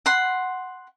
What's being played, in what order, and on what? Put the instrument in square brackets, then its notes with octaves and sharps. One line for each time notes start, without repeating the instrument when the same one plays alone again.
[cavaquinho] F#5 B5 C6